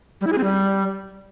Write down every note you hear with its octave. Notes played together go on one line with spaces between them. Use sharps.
G3
E4
G#4
C4
G3